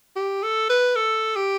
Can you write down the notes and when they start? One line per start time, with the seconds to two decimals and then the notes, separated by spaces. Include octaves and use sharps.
0.16 G4
0.43 A4
0.70 B4
0.96 A4
1.36 G4